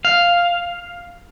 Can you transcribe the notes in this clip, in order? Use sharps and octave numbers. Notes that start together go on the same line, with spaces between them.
F5